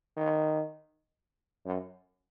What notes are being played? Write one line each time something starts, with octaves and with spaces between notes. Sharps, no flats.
D#3
F#2